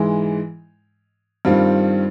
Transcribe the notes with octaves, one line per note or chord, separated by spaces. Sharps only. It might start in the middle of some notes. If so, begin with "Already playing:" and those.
Already playing: G#2 E3 G#3
G2 D#3 G3 C4 F4